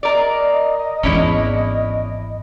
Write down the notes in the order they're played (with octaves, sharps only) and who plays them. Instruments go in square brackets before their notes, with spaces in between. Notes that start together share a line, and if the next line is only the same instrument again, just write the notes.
[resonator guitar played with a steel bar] A#4 D5 [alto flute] D#5
[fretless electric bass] G#1 E2 [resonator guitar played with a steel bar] C#4 D4 E4